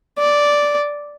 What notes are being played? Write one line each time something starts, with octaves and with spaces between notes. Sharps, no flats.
D5